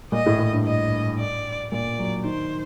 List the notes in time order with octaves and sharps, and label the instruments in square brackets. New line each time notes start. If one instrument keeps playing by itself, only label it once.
[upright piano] A#2 [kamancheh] D#5
[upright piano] A2
A2
G2
[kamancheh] D#5
D5
[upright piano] A#2 [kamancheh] D5
[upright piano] F#3
[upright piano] D#3 [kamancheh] C5